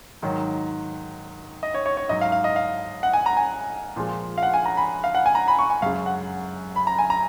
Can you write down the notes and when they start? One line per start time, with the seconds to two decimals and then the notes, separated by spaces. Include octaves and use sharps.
0.22 G#2 D#3 F#3
1.63 D#5
1.75 C#5
1.86 C#5
1.97 C#5
2.09 G#2 F#3 D#5
2.21 F5
2.32 F5
2.44 D#5
2.56 F5
3.03 F#5
3.13 G#5
3.26 A#5
3.37 G#5
3.96 A#2 F3 G#3
4.38 F5
4.43 F#5
4.54 G#5
4.66 A#5
4.77 B5
5.04 F5
5.15 F#5
5.26 G#5
5.35 A#5
5.48 B5
5.59 C#6
5.70 G#5
5.82 F#2 C#3 G#3 F5
6.06 F#5
6.76 B5
6.87 A#5
6.99 G#5
7.10 A#5